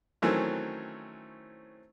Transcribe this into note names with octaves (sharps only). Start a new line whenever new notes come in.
D#3 E3 F#3 A3 C4 C#4